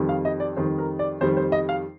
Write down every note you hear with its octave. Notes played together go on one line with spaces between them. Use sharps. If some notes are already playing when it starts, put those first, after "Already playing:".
Already playing: F2 D#3 G3
F5
D#5
D5
F2 D#3 G3 C5
A#4
D5
F2 D#3 G3 C5
C5
D#5
F5